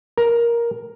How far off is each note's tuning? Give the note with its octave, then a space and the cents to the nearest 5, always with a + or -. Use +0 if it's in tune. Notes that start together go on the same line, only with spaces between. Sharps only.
A#4 +10